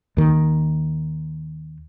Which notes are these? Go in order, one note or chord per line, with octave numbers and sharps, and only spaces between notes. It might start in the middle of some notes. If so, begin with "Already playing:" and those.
D#2 D#3